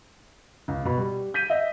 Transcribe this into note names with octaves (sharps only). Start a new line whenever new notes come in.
C#2
B2 B5
G3
G6 B6 D#7
D#5 E5